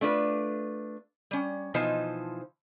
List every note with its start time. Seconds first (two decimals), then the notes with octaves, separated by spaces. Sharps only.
0.01 A3 D4 F4 B4
1.31 G3 C#4
1.74 B2 E3 F3 D#4 C5 A5